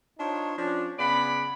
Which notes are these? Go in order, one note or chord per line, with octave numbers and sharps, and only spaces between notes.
D4 D#4 F4 C5 C#5
F3 C#4 D4
C#3 B3 D5 F#5 B5